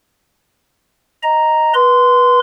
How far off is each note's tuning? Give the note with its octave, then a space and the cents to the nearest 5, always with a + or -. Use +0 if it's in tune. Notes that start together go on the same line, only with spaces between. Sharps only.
D#5 +0 A#5 +0
B4 -20 C6 -20